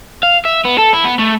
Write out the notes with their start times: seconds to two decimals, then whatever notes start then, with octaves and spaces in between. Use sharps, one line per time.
0.23 F5
0.45 E5
0.65 B3
0.79 A4
0.93 E4
1.05 B3
1.19 A3